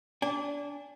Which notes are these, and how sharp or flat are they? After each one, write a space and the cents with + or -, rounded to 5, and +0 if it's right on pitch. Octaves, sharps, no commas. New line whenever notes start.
D4 -25 G#5 -35